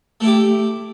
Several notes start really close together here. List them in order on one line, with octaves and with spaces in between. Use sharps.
A3 E4 G4